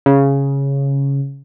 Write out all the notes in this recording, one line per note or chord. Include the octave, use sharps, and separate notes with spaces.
C#3